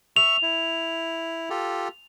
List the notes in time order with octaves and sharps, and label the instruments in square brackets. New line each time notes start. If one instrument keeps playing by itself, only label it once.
[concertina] E5 C#6 [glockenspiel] F7
[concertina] E4
F4 G4 A4